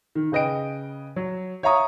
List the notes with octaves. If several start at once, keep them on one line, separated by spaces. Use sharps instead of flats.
D#3
C#3 B4 D#5 G5 D7
F#3
C#5 E5 F5 A#5 C#6 D#6